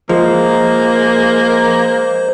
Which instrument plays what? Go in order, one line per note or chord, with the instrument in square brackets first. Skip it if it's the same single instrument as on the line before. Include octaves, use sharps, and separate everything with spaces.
[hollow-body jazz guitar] F3 [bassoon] G#3 [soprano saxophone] A#3 [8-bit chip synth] C5